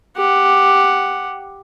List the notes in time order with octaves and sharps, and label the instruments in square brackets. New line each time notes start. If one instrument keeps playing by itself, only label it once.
[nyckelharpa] G4 F#5